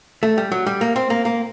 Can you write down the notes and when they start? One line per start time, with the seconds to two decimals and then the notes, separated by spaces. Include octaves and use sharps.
0.23 A3
0.38 G3
0.52 F#3
0.67 G3
0.81 A#3
0.96 C4
1.10 A#3
1.25 A#3